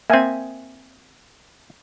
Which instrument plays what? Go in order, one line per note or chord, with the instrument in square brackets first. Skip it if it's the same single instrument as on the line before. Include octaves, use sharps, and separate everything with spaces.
[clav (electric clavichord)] A#3 C4 [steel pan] E5 G#5